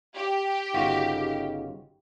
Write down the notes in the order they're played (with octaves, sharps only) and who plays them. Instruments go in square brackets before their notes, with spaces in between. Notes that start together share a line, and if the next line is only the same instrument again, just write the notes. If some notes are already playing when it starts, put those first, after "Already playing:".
[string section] G4
[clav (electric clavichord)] G1 F4 F#4 [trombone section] C#3 D#4